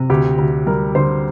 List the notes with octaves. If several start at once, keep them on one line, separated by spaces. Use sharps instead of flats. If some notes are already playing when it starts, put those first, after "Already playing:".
Already playing: C3
D2 G4
D2
G3 A#4
D3 C5